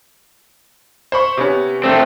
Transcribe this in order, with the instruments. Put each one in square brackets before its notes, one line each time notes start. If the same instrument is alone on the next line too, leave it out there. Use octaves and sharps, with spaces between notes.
[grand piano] C5 B5 C#6
C3 B3 C#4
[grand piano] E1 [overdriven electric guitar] A3 C4